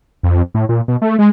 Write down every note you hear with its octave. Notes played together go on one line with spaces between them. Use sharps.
F2
A2
A#2
B2
A3
G#3